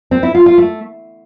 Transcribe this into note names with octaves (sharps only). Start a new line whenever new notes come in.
C4
E4
F4
F4
A3